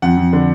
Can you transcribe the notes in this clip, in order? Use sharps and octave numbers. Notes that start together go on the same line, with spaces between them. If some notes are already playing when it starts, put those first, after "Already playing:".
F2 F#5
F2
D3